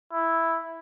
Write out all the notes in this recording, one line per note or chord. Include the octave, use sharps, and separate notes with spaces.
E4